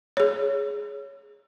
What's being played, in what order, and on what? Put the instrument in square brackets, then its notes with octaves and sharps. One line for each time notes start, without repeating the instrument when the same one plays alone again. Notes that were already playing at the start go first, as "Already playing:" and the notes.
[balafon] G#4 C#5